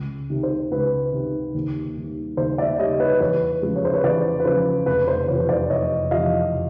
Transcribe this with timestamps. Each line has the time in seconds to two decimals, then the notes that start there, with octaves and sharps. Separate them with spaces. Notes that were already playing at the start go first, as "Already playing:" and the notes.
Already playing: C#2
0.30 C3 D#3
0.43 C5
0.71 C#2 B4
1.13 C3 D#3
1.54 D#2
1.97 D#3 G3
2.37 D#2 C5
2.58 D5 E5
2.79 D#3 G3 C#5 D#5
3.00 B4 C#5
3.20 E2 B4 C#5
3.62 C#3 F3 G#3
3.76 C#5
3.85 C5
3.93 B4 C#5
4.04 E2 C5 D5
4.40 B4
4.45 C#3 F3 G#3 C5
4.86 F1 B4
5.08 C5
5.28 E2 C3 F3 B4 C#5
5.49 C5 D5
5.69 F1 C#5 D#5
6.11 E2 C3 F3 D#5 F5